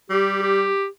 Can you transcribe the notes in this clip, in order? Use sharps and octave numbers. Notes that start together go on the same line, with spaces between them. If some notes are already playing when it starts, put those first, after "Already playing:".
G3 G4
G4